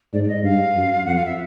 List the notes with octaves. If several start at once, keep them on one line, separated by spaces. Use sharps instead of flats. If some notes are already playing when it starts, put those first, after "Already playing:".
G#2 D5
D5
D#5
G2 F5
F#2
F2 F#5
F5
E5